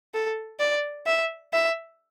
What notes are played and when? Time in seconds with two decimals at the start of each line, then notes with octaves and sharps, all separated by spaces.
0.14 A4
0.60 D5
1.07 E5
1.53 E5